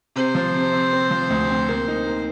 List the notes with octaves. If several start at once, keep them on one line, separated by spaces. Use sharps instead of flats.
C3 C5
F3
C3
C3
C4
F3
D2
C4
A#3
D#4
A#3